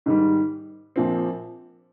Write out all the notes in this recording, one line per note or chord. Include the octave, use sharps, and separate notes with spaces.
G#2 D#3 G3
A#1 A#2 F3 C4